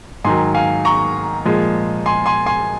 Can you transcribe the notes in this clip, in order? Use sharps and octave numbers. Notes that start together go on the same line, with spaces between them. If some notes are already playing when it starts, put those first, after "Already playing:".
G#2 D#3 F#3 G#5 C6
F5 G#5
A#5 C#6
A#2 F3 G#3
G#5 C6
G#5 C6
G#5 C6